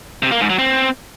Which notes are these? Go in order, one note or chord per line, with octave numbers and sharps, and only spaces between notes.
C3
A#3
G#2
F#3
C4